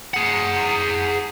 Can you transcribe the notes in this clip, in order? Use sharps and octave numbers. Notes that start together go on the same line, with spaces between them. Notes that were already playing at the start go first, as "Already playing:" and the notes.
G#4 F#5